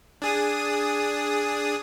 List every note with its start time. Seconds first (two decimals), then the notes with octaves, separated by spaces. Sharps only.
0.22 D4 G#4 D#6